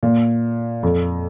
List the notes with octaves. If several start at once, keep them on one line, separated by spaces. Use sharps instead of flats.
A#2
F2